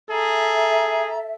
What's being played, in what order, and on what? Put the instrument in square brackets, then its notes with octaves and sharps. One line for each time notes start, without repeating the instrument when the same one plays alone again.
[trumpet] G#4 [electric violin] A4 [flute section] E5 [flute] A#5